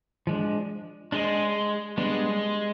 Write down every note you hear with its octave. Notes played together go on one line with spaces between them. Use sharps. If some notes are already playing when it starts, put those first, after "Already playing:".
F3 G#3 D4
G#3 D4 G#4 C5 D#5
G3 G#3 B3 D4